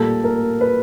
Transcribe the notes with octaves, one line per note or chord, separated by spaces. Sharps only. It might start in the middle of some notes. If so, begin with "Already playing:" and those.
Already playing: A#2 G3 A#3 A4
A#4
B4